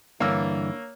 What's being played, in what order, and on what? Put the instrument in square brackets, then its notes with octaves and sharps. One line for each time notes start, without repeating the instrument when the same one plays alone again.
[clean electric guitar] G2 D3 E3 [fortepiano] A#3 C#5 E6